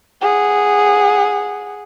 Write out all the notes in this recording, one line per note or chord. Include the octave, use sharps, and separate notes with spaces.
G#4 F#5